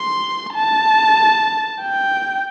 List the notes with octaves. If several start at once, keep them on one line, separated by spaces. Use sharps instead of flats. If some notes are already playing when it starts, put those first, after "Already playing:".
Already playing: C6
A5
G5